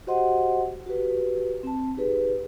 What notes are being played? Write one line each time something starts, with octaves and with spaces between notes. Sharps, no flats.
F#4 G4 C5 D#5 F#5 C6
F#4 G4 B4
C4 A5
D#4 G4 G#4 B4